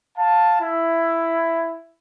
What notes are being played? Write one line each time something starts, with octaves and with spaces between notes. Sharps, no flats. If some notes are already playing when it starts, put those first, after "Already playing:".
F5 A5
E4